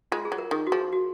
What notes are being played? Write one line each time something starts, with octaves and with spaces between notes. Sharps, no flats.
G#3 F4
G#4
F#3
A#4
D#3 G#4
F#4
F3 G#4
F#4